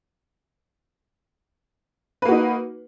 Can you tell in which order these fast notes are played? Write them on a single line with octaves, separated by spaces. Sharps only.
B4 A#3 F#4 D#4